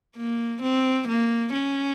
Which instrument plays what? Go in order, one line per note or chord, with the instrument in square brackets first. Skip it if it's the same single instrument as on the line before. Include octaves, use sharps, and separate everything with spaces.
[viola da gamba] A#3
C4
A#3
C#4